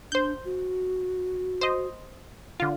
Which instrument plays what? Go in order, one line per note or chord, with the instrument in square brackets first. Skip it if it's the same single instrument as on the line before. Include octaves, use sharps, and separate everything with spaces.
[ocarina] D4 [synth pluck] C5 G6
[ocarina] F#4
[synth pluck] C5 D#5
D3 F4